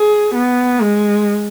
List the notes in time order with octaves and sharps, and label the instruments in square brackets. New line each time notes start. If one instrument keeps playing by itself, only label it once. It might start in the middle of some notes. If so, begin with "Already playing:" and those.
Already playing: [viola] G#4
B3
G#3